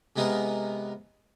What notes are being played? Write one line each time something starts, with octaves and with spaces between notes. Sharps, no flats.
C3 G#3 B3 D#4 A#4 F#5